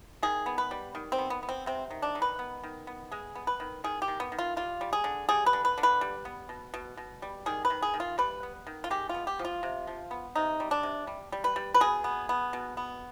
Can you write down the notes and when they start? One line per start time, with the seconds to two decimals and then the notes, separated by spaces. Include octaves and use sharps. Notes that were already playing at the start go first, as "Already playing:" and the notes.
0.23 D#3 G#4
0.46 B3
0.58 B4
0.71 G3
0.95 D#3
1.12 C4
1.18 B3
1.30 B3
1.43 B3
1.49 C4
1.66 C3 C4
1.91 D#3
2.02 D4
2.15 D#3
2.22 B4
2.39 B3
2.63 D#3
2.87 B3
3.11 G#3 G#4
3.35 B3
3.47 B4
3.60 D#3
3.84 D#3 G#4
4.02 G4
4.08 D#3
4.20 B3
4.32 D#3
4.39 F4
4.57 G3 F4
4.81 G3
4.93 G#4
5.04 D3
5.29 G3 G#4
5.46 B4
5.53 D3
5.65 B4
5.78 D3
5.83 B4
6.01 G3
6.25 B3
6.49 B2
6.74 B2
6.97 B2
7.22 G3
7.46 D#3 G#4
7.65 B4
7.70 D#3
7.82 G#4
7.94 D#3
8.00 F4
8.18 G3 B4
8.43 B3
8.67 D#3
8.84 F4
8.90 G#3 G4
9.09 B3 F4
9.27 G4
9.39 F3
9.45 F4
9.63 C3
9.87 F3
10.11 B3
10.36 C3 D#4
10.60 G3
10.71 D4
10.83 C3
11.07 G3
11.32 G3
11.44 B4
11.56 G3
11.74 B4
11.80 B2 G#4
12.04 B3
12.29 B3
12.53 B2
12.77 B3